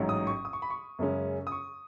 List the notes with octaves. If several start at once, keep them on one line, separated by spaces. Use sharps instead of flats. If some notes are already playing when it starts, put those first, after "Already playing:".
Already playing: A1 G#2 F#3
D#6
C#6
D#6
C#6
B5
C#6
F#2 C#3 G#3 C#4
D#6
C#6